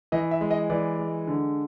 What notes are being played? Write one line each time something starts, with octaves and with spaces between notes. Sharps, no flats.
E3 D#5
E5
G#3
D#5
E3 D5
G#3
D3